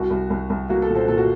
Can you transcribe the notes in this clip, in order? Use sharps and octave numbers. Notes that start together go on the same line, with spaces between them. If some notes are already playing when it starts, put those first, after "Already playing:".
Already playing: C2 F#4
C2
C2
C2
A#3 F#4
A4
A#2
A4 C5
A#2 A4
F#4